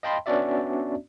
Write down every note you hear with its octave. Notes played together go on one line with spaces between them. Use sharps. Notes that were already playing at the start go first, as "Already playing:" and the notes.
D#5 F5 G5 A5 B5 C6
B3 C#4 D4 F#4 D5 E5